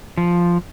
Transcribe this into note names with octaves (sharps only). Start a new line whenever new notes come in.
F3